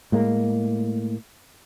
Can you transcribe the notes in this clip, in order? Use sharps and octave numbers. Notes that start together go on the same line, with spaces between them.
A2 G#3 A#3